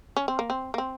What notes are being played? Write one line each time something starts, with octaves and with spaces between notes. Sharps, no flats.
C#4
C4
A#3
C4
A#3
C4